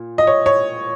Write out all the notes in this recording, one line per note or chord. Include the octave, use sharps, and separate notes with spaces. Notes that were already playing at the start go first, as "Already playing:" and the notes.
Already playing: A#2
D#5
C#5
C#5